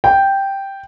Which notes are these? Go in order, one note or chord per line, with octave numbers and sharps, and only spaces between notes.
G5